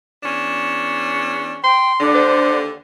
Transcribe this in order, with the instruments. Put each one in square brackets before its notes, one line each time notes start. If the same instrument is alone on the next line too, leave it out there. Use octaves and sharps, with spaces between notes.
[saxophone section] E2 C#4 D4
[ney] G5 [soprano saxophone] C6
[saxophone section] D#2 D3 [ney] D4
[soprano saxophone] C5